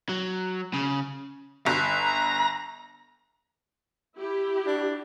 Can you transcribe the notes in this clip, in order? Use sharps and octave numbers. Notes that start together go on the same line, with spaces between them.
F#3
C#3
G1 A#5
E4 G4
D4